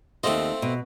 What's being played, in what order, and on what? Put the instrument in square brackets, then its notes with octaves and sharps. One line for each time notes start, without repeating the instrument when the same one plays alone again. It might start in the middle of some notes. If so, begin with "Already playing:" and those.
[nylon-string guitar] D#2 D#5 [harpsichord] A3 C4 F4
[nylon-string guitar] B2